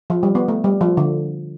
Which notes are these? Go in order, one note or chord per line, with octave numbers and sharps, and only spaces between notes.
F3
G3
B3
A3
G3
F3
D3